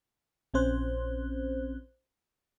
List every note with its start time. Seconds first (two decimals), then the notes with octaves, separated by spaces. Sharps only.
0.54 A#1 C4 C#4 C5 F#6